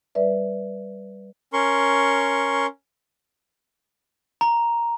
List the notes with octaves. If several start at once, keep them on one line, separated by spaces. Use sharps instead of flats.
G3 B4 D5 E5
C#4 A#4 C6 C#6
A#5